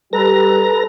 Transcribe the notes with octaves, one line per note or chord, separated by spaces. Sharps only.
G3 G4 A4 B4 A#5 A#6